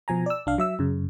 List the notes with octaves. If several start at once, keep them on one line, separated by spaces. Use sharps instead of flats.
B2 F3 G#5 A#5
D5 E6
C2 D4 F5
F#3 E5 E6
F#2 C#3